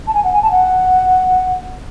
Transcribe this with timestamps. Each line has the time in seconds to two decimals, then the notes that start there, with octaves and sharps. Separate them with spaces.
0.07 A5
0.14 G#5
0.24 F#5
0.33 G#5
0.43 A5
0.51 F#5